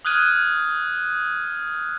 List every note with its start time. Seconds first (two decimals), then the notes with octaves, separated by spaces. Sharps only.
0.05 D#6 F6 F#6 G#6 D#7